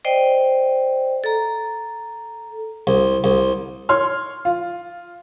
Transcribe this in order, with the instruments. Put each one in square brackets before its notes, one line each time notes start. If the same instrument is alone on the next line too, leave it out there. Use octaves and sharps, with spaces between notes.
[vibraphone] C5 D5 D#5 G5
A4 A#5
[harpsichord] C2
C2
[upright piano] C#5 C6 F6
F4